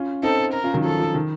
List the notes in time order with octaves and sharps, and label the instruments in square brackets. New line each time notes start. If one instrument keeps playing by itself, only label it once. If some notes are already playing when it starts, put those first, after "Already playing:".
Already playing: [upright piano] C#4 F4
[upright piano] C4 D#4 [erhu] A4
[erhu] A#4
[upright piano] C#4 F4
D#3 F#3
[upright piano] F3 [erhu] A4
[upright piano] F3
D#3